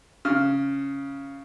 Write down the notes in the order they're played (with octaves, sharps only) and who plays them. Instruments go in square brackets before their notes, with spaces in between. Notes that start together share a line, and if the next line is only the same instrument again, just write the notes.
[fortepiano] C#3 F6